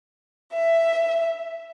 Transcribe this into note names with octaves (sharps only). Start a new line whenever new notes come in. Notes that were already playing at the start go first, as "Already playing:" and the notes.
E5